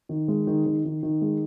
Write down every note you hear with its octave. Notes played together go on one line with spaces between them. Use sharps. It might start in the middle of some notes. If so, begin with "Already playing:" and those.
D#3
G#3
D#3
D#3
D#3
D#3
G#3